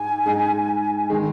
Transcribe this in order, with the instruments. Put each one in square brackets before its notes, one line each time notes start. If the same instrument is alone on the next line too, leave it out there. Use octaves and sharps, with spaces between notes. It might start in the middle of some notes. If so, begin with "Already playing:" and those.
Already playing: [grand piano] G#2 G#3 D#4 [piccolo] G#5
[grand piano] G#2 G#3 D#4
D#3 G#3